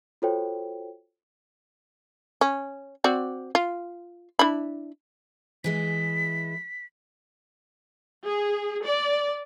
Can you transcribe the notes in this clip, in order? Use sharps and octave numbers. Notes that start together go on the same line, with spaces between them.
F4 F#4 A4 C5 C#5 G5
C#4
C4 F#4 D5
F4
D4 E4 B5
E3 G#3 E4 B6
G#4
D5